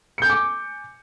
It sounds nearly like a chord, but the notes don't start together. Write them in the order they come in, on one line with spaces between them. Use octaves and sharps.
C#7 G6 G#5 D6